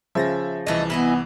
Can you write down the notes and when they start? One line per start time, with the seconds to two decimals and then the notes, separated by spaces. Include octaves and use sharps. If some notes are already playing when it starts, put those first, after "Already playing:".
0.15 C#3 F3 E5 A6 A#6
0.67 C2 E3 A3 D#5
0.90 B3 E4 D#5 G#5